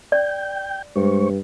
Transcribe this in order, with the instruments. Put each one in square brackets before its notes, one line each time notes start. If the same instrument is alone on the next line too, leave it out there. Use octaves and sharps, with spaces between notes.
[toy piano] D5 [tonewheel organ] G5 G6
[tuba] G2 [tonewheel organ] G#3 C5 C#6